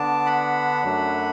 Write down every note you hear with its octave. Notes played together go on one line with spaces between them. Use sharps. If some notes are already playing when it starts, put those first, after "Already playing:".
Already playing: D3 B3 D4 A5 D6
F#5 B5
F#2 F#3 A3 D4